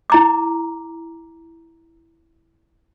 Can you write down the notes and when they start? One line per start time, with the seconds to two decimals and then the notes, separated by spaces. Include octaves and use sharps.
0.10 E4 A#5 D6